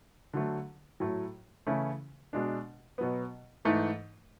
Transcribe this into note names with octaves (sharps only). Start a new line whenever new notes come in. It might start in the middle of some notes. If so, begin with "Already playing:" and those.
D3 F#3 A3
A2 F#3 A3
C#3 E3 A3 C#4 E4
B2 G#3 D4
B2 F#3 B3
G#2 E3 A3